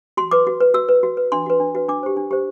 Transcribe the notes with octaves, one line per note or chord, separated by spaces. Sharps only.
F#4 C6
B4 D6
F#4
B4
F#4 E6
B4
F#4
B4
D4 C6
F#4 B4
D4
F#4 B4
D4 D6
G4 C5
D4
G4 C5